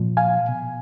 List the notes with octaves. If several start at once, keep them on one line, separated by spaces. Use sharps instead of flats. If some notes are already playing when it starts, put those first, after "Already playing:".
Already playing: A#2 F3
F5 G#5
B2